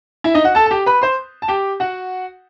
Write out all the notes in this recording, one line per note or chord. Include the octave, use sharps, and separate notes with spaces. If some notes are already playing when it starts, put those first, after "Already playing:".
E4 E5
D#4 D#5
F#4 F#5
A4 A5
A5
G4 G5
B4 B5
C5 C6
A5
G4 G5
F#4 F#5